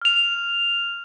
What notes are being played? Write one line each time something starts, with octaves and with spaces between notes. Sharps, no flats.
F6 F7